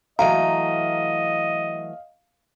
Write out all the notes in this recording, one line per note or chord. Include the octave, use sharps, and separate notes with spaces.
E3 F#3 A3 D#5 F5 A#5